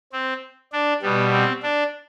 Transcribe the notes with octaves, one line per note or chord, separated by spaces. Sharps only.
C4
D4
B2 G3 B3
C4
D4